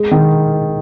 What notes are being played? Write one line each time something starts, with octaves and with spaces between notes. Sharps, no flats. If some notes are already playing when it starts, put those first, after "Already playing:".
Already playing: G#3
D#3